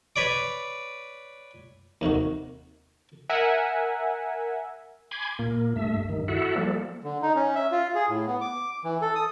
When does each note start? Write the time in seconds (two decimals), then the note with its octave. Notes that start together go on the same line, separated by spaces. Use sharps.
0.16 B4 C#5 D5 D6
2.01 D#2 C3 D#3 F#4
3.29 A#4 E5 F#5 G#5
5.11 G#5 B5 C6 D6 G#6
5.39 A#2 A#3
5.76 G2 A3 E5
6.09 G2 D#3
6.28 E4 F#4 A4 E5 F#5
6.56 F3 G3 A#3 A4
7.04 D3
7.22 D#4
7.35 C#4
7.55 E5
7.72 F4
7.95 G#4
8.09 A2
8.27 B3
8.41 D6
8.84 E3
9.02 A4
9.15 D#6